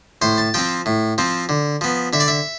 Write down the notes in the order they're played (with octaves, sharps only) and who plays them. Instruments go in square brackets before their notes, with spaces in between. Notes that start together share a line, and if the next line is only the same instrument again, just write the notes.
[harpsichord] A2 C5
A5
F3 C4 G5
A2
F3 C4
D3
F3 B3
D3 E5
D5
E5